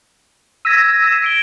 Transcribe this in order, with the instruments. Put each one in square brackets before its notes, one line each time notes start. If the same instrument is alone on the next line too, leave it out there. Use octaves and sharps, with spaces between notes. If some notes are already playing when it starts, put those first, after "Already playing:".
[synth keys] E6 A#6 [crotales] G#6 B6 D#7
[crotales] C7 E7
A#6 D7 G7